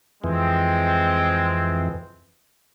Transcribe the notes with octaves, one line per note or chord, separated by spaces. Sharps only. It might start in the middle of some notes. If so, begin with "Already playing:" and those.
F2 E3 G#3 C4